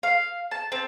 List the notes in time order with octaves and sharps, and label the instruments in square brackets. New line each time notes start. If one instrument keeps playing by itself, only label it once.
[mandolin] F5
A5
C4